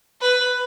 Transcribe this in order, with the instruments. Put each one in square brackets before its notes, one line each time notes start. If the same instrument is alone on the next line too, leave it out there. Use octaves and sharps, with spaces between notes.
[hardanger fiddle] B4